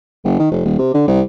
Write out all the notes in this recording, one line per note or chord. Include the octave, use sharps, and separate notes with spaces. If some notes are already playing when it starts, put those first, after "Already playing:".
F#1
D#3
F1
D#1
C3
D3
C2